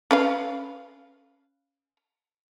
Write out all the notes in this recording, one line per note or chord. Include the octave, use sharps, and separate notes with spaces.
C#4 B4 F5